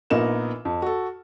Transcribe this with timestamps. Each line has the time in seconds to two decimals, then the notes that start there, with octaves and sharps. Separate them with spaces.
0.10 A#1 A#2 B3 D#4 A#4 E7
0.65 F2
0.82 F#4 A4